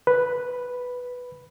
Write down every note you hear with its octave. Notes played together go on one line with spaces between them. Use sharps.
B4